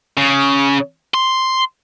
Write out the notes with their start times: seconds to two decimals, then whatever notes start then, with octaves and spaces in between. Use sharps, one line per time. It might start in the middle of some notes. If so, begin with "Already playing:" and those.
0.17 C#3
1.14 C6